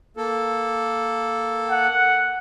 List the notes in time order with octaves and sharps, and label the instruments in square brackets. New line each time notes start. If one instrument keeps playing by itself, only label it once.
[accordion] A#3 A4
[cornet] F#5